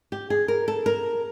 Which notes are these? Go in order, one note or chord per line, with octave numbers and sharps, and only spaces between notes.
G4
G#4
A#4
A4
A#4